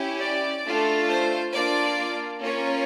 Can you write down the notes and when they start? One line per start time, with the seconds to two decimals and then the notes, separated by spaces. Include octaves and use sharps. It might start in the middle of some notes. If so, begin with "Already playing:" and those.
Already playing: C#4 E4 G4
0.21 D5
0.65 A3 D4 F4 A4
1.09 C5
1.53 A#3 D4 F4 D5
2.42 A#3 C#4 F4 C#5